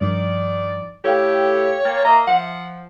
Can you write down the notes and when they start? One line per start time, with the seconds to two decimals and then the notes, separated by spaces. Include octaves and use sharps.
0.01 G2 D#3 F3 D5
1.04 A2 E4 G4 A4 C#5 F5 G5
1.85 A#2 A#3 G5 F6 A6
2.05 A#3 D#5 E5 A#5
2.27 F3 F#5